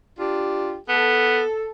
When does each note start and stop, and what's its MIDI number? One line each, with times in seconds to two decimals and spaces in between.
0.18 0.78 62
0.18 0.78 65
0.18 0.78 67
0.88 1.42 59
0.88 1.71 69